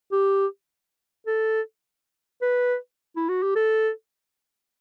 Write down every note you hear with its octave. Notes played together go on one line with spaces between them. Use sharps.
G4
A4
B4
E4
F#4
G4
A4